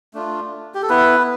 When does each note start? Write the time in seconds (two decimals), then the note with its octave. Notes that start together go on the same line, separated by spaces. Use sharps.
0.14 A3 D4 F4
0.75 G4
0.82 A4
0.89 B3 E4 B4